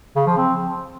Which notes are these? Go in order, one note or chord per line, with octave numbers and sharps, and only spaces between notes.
C#3
F3
C4